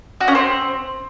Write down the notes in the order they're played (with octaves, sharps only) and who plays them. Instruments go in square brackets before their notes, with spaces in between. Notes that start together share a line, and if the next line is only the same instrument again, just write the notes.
[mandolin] F#4
C#4
C4